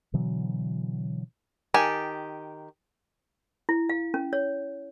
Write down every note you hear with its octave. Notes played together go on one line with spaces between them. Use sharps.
B2 D3 E3 F#3
D#3 G4 G#5 A5
E4
F5
C#4
C#5